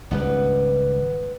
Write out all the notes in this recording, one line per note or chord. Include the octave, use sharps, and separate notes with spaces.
G#1 C#2 G3 B3 B4